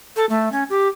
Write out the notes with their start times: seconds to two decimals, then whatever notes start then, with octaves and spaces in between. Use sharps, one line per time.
0.16 A4
0.29 A3
0.52 C#4
0.70 G4